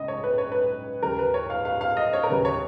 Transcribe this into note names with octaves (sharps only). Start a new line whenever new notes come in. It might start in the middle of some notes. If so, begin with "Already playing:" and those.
Already playing: C#2 C#3 D#5
C#5
B4
C#5
B4
D#2 C#3 A#4
B4
C#5
F5
F5
F5
D#5
C#5
A#4
D#2 C#3 B4
C#5